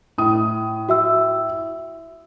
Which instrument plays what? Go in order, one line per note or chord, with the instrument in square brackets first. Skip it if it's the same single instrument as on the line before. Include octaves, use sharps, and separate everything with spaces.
[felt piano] A2 D#6
[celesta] F#4 E5 E6